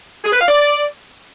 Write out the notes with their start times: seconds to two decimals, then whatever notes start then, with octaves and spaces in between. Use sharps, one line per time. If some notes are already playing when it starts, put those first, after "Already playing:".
0.24 G#4
0.32 B4
0.40 F5
0.48 D5